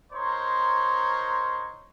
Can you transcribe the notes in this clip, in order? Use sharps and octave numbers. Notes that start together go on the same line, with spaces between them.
D#4 A#4 C5 C#5 C6